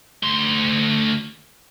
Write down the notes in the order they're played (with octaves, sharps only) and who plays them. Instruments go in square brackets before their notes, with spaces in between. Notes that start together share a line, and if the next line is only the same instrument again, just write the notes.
[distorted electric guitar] D2 C6